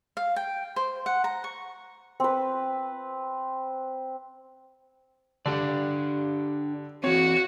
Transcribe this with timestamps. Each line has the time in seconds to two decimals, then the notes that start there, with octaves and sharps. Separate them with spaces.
0.17 F5
0.36 G5
0.76 C5
1.06 F#5
1.24 A#5
1.44 C#6
2.20 C4 B4
5.46 D3 D4 G4 D5
7.04 E3 C4 F#4 C#5